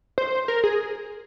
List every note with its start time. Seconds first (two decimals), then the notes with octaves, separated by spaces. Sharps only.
0.18 C5
0.48 A#4
0.64 G#4